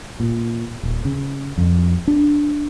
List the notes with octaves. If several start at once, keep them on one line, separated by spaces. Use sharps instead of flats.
A#2
D#1
C#3
F2
D4